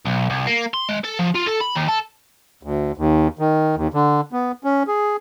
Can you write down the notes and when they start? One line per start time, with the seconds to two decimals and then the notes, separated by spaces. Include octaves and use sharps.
0.05 B1
0.30 C2
0.47 A#3
0.74 C6
0.89 G#3
1.04 A4
1.19 F3
1.35 F4
1.46 A4
1.61 B5
1.75 D#2
1.88 A4
2.63 D2
2.97 D#2
3.39 D#3
3.76 D#2
3.94 D3
4.32 B3
4.64 C#4
4.87 G#4